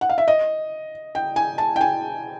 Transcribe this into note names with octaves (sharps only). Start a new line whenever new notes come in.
F#5
F5
E5
D#5
G5
G#5
A5
G5
G#5